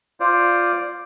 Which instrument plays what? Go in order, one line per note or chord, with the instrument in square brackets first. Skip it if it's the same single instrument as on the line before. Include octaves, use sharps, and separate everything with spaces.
[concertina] F4 C5 D5